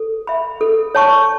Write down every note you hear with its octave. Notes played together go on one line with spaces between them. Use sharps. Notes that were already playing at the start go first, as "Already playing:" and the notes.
Already playing: A4
E5 B5
A4
C#5 A5 C#6